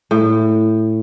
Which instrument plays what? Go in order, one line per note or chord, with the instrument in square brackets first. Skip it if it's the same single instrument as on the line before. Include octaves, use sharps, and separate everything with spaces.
[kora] A2